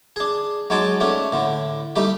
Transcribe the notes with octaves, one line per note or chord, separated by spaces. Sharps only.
D4 G#4
F#3 G#3 D#4 G#5 A5 D6
A3 C#4 D4
A2 D3
G3 A3 D#4 G4